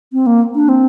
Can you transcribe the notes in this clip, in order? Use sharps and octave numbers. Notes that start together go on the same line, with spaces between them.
C4
A#3
D4
C4